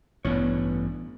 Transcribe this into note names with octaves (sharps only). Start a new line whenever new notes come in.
A1 G2 B3 D4 C#5